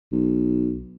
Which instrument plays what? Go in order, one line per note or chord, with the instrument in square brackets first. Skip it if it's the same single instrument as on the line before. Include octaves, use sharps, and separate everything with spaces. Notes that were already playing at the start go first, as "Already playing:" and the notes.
[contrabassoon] B1